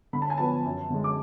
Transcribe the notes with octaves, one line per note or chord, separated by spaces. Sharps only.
D3 B5
A5
G#5
F3 B3 A5
F#2
D3 G#3
D6